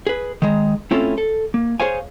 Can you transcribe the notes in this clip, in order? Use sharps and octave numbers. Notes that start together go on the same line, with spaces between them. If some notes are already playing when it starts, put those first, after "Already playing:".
G#4 B4
D#3 G#3 A#5
A3 C4 C#4 E4 F4 A4
A4
A#3
G#4 C5 C#5 F5 G#5